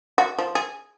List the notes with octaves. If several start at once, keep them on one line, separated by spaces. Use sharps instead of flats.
F#4
F3
G#4